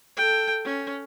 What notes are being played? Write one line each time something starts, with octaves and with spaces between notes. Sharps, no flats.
A4 G5
C#4